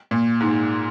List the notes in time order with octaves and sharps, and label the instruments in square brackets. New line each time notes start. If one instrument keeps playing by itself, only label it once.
[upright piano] A#2
G#2